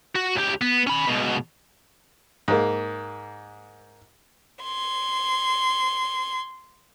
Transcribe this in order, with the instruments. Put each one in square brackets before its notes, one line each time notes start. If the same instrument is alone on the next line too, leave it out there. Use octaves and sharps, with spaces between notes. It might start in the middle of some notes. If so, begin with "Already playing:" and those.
[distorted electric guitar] F#4
C#2 G4
B3
C#4 B5
C#2 B2
[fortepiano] G#2 A#3
[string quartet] C6 G#6